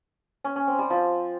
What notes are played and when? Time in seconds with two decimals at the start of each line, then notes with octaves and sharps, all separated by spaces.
0.44 C#4
0.56 C#4
0.67 C4
0.79 G3
0.90 F3